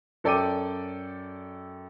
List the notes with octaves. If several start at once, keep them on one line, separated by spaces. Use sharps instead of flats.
F#2 A4 D5 G5 D6 D#7